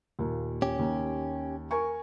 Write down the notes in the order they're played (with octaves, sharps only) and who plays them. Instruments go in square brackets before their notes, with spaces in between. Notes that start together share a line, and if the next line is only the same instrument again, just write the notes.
[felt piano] D#2 A#2
[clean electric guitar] C#4 G4
[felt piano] D#2
A#4 G#5 C#6